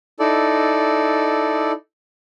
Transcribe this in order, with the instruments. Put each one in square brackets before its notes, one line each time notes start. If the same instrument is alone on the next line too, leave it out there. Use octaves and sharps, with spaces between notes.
[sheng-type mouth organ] D#4 E4 A4 D5